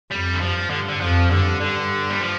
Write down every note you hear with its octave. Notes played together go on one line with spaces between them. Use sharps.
F2 G3
D3
G2 F3
G2 D3
D3
F2 F3
G2 D3
D3
G3
F3